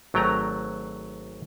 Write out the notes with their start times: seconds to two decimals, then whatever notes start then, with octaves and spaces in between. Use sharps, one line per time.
0.14 G#1 F#3 A3 G5 A#5